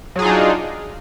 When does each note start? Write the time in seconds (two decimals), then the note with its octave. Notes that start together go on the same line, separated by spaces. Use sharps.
0.16 F#3
0.19 G#4
0.22 F4
0.25 D#4
0.29 D4